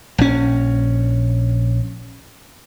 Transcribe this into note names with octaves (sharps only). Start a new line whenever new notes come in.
A#1 C#4